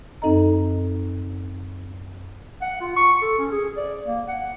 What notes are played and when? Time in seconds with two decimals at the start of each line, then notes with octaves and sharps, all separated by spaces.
0.22 F#2 C4 D#4 A4 D#5 A#5
2.62 F#5
2.81 F4
2.96 C#6
3.22 A4
3.39 C#4
3.52 G#4
3.77 D5
4.06 A#3
4.28 F#5